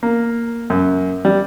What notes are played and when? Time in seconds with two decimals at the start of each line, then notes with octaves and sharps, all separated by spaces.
0.03 A#3
0.70 F#2
1.25 G3